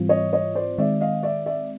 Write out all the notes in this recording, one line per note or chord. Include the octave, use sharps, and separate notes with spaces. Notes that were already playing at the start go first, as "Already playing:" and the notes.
Already playing: G#2 E3 G3 C4 F4
C#5 D#5
C#5 D#5
C5 D5
D#3 G#3 C4 D5 E5
D#5 F5
D5 E5
D5 E5